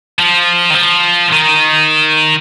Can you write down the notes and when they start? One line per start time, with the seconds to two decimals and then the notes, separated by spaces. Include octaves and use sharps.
0.19 F3
0.70 D#3
0.75 F3
1.32 D#3